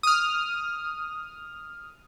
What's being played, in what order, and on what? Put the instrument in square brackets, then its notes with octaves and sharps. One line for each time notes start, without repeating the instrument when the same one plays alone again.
[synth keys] D#6 F6